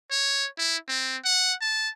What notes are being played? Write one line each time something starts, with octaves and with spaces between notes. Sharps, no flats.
C#5
E4
C4
F#5
A5